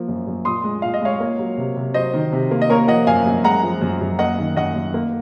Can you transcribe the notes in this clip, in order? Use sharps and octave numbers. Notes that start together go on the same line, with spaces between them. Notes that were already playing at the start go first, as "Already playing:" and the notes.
Already playing: F3 A#3
F#2
F#2
A#2 C6 D#6
G#3
A#2 F5
D#5
G#3 C#5 F5
A#3
F#3
C3
C3
F#3 C5 D#5
D#3
C3
A#3
D#5
A#3 A#4 C#5
F3 D#5 F#5
F#2 F5 G#5
F#2
G#3 F#5 A#5
F3
F#2
F#2
A#3 D#5 F#5
D#3
F#2 D#5 F#5
F#2
A#3